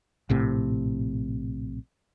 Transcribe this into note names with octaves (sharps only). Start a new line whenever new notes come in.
A#1 A2 C3